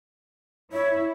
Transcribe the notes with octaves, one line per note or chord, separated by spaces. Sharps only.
E4 C#5